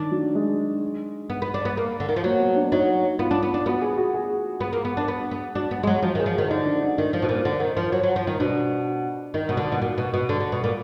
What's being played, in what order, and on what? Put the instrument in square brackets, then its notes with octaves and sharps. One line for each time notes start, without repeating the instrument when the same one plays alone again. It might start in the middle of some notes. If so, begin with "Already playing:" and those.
Already playing: [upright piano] D#3 [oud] D4
[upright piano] F#3
G#3
[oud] B3
B3
D4
B3
A#3
D3
D#3
F3
[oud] F#3 [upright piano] A#3
[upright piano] B3
D4
[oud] F#3 [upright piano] D#4
[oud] B3 [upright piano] F4
[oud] D4
B3
D4
[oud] B3 [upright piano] F#4
[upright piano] G#4
F#4
G#4
[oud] B3 [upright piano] G#4
[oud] A#3
B3
D4
B3
B3
[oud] D4 [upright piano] F#4
[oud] B3
G#3
F#3
[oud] F3 [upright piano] F#4
[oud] D#3
[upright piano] G#4
[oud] F3
[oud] D#3 [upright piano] F#4
[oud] D3 [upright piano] D#4
[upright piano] D4
D#4
D4
[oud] D#3
F3
B2
A#2
D3
D#3
F3
F#3
F#3
F3
D#3
[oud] B2 [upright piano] D4
[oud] D#3 [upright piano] D#4
[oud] B2 [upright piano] D#4
[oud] D3
[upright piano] F#4
[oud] B2
[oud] A#2 [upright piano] F#4
[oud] B2
B2
D3
D3
B2
A#2